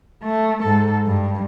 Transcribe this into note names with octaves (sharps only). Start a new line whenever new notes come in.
A3
G#2 A4
G2